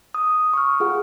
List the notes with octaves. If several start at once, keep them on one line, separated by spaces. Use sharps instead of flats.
D#6
C#6 F6
F4 G#4 F#5